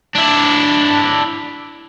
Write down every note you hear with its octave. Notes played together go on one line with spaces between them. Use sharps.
D4 E4